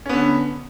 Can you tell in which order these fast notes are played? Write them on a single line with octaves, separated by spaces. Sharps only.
C#4 B3 D3